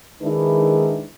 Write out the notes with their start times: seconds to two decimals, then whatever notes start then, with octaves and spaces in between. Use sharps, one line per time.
0.22 D#3 G#3 D4 E4 B4